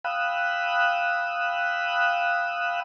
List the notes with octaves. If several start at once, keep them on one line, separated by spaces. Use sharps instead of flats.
F5 G5 B5 D#6 E6 F#6